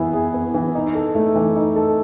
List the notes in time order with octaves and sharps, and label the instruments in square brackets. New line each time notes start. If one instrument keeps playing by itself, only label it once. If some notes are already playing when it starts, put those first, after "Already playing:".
Already playing: [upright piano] E3 B3 E4 G#4
G#4
B3
E3
D#4
A4
A3
E3
D#4
A4